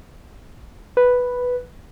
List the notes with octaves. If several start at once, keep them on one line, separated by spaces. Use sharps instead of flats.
B4